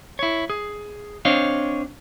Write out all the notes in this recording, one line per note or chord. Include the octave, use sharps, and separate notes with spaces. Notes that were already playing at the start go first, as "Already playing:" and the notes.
E4 C#5
G#4
C4 D4 C5 C#5 D#5 F5